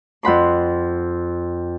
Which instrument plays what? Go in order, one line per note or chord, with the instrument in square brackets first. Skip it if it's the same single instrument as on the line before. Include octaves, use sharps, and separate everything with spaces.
[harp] F2 F#5 B5 C6